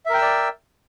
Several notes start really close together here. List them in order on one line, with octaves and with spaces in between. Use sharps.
E5 A#4 G5 E6 D5